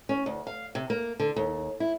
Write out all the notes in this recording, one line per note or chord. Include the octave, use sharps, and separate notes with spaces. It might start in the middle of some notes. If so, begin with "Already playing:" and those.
C#4
D2
F5
C3
A#3
D3
D#2
E4